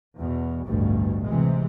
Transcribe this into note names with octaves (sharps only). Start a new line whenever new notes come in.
E2 B2
A1 D2 G2 B2
C3 E3 G#3